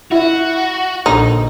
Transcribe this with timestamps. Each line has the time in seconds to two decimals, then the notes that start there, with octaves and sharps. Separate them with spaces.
0.12 E4 F#4 E5
1.06 A#1 D3 D#4